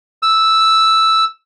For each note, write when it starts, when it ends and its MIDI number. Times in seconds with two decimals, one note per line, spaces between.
0.23 1.25 88